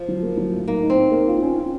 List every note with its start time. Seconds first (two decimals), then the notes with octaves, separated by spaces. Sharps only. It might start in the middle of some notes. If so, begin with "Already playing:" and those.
Already playing: F3
0.08 F#3
0.23 A#3
0.37 F#3
0.52 A2
0.67 A#3 D#4
0.83 D#4
0.90 C4
0.97 D#4
1.11 A#3
1.28 F4
1.42 C#4
1.57 F4